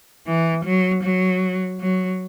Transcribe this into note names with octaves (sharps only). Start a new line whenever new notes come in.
E3
F#3
F#3
F#3